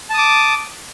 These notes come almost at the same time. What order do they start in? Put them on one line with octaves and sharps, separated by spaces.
A5 D#6 D6